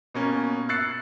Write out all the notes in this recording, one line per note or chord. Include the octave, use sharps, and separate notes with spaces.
B2 A#3 C#4
E6 F#6 A6 C7 C#7